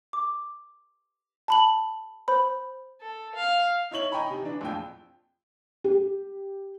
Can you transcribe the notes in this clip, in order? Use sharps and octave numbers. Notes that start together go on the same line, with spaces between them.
D6
A5 B5 F#7
C5 B5
A4
F5
D#4 E4 C#5 F#7
D#5 G5 G#5 A#5 B5 C#6
C3 D#4
E3 D4
A#1 F2 G5
G4